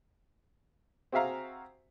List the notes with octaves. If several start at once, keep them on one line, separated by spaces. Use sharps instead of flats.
C4 F#4 G#4 E5 F5 A#5